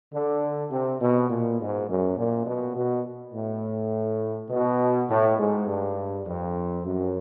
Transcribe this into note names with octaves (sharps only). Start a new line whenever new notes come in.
D3
C3
B2
A#2
G#2
F#2
A#2
B2
B2
A2
B2
A2
G#2
G2
F2
F#2